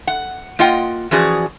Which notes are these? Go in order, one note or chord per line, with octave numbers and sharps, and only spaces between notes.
F#5
A#3 F4 D#5 F#5 G5
E3 F3 C#4 F#4 G#4 D5